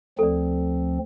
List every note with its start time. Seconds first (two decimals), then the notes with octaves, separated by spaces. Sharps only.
0.19 D2 F3 C4 A4 D5